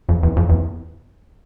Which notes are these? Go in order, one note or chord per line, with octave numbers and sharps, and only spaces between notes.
F2
E2
F2
E2